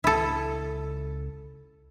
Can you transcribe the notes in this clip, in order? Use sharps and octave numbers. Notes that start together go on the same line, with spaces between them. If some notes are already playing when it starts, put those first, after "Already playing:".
C#2 E4 A4